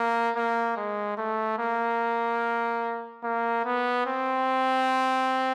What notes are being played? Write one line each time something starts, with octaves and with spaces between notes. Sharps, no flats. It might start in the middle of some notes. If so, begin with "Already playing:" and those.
Already playing: A#3
A#3
G#3
A3
A#3
A#3
B3
C4